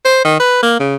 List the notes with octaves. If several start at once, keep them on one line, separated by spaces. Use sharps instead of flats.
C5
D#3
B4
A#3
C#3